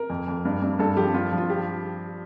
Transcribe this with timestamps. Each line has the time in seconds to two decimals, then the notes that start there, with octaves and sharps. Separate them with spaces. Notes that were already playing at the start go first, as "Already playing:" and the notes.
Already playing: A#4
0.10 F2
0.28 F2
0.45 G2
0.62 G2
0.79 G2 A4
0.97 F3 G4
1.14 G2 F4
1.32 F3
1.38 F4
1.50 G4